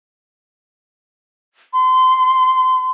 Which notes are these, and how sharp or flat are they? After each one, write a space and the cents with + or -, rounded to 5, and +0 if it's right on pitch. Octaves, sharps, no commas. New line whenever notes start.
C6 -30